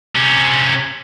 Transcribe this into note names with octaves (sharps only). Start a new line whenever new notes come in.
C3 C#4